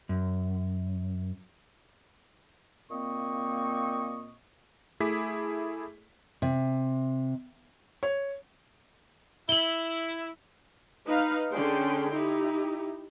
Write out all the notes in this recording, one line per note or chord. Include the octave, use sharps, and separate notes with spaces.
F#2
A#2 A#3 C4 D#5 C#6
A3 E4 G#4 D6 B6
C3
C#5
E4 F#7 G7
D#4 B4 F5
D3 C#4 D4 G#4 G5 C6
D#4 E4 G4